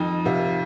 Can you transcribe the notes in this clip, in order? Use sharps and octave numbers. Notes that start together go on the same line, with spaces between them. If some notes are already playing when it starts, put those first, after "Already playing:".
Already playing: F2 D#4
C3 F4